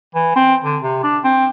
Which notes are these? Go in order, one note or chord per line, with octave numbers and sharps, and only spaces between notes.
E3
C4
D3
C3
D4
C4